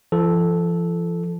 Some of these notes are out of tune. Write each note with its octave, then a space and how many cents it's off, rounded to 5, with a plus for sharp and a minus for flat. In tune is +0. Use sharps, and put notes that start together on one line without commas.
F3 -45 A4 -10